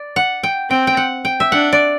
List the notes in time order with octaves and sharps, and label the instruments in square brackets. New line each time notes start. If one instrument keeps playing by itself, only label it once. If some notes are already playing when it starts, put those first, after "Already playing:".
Already playing: [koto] D5
F#5
G5
[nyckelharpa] C4 [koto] G5
[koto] G5
F#5
G5
E5
[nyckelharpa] D4 [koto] F#5
[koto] D5